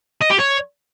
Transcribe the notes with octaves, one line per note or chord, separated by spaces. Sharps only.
D#5
G4
C#5